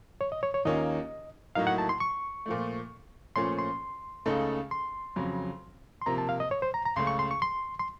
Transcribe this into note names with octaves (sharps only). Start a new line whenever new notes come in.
C#5
D#5
C#5
C#5
D#2 D#3 A#3 C#4 F4 D#5
A2 F#3 A#3 D#4 F5
F#5
A5
C6
C#6
A#2 F3 A3
A#2 F3 A3 C#4 C6
C6
C#2 C#3 A3 D#4 A4
C6
F2 C#3 F#3
C6
C3 F3 A#3 A#5
A5
F5
D#5
C#5
C5
A#5
A#5
C#2 C#3 A3 C6
C#6
C6
C#6
C6
C6